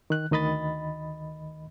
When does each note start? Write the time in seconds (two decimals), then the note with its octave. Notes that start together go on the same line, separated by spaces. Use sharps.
0.10 D#3 F#6
0.31 D2 D#3 D#5 B5 A6